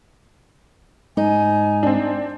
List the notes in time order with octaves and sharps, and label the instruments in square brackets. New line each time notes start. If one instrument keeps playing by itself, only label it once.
[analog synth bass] G#2 [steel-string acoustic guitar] D#4 [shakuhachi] G#5
[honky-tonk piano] C4 D4